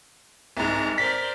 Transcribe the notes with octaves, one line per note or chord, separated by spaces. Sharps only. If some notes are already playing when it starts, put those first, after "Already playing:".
C2 G#2 A#5
A#4 C5 D5 B6